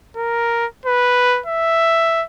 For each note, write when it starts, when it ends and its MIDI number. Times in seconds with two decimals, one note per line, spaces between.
0.17 0.66 70
0.86 1.41 71
1.46 2.24 76